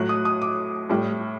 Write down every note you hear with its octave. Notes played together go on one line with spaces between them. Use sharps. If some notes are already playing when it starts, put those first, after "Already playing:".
Already playing: A2 F#3 F#6
D#6
D#6
D6
A2 G3